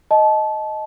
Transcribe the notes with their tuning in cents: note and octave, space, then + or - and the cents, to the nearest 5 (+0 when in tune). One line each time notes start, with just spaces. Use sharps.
D#5 +0 A5 -25